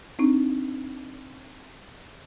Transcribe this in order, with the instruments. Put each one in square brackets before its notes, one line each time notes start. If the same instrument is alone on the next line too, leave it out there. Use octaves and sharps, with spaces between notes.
[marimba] C4 D4 D#4